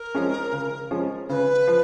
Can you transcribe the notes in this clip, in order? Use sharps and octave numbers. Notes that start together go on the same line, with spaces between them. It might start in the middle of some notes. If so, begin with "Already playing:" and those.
Already playing: A#4
F3 G#3 C#4
C#3
F3 G#3 C#4
C#3 B4 C5
F3